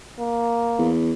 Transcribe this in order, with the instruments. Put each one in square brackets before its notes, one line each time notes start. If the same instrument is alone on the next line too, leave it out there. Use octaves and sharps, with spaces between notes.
[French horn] A#3
[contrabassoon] E2